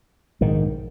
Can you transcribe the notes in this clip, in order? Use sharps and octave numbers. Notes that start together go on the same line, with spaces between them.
A#1 G#2 D#3